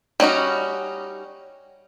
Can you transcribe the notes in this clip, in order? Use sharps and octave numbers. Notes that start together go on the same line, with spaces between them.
G3 C#4 D#4 F#4